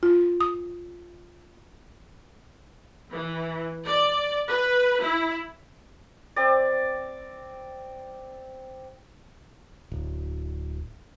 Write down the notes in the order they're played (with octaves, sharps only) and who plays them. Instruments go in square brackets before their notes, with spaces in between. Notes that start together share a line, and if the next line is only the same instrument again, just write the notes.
[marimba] F4
D#6
[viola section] E3
D5
B4
E4
[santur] C4 D5
[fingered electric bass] D1